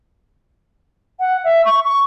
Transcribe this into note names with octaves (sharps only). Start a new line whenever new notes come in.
F#5
E5
C#6
C#6